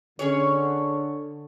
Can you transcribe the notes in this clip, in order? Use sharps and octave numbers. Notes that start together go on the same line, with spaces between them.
D3 C#4 G#4 C#5